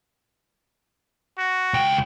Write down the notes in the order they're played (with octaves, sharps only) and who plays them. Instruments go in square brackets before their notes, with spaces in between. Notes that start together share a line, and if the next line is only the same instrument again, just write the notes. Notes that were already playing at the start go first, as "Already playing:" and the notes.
[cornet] F#4
[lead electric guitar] C#2 G5